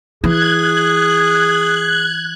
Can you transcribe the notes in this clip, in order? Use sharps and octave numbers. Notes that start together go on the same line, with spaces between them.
E3 G#4 F#6 G#6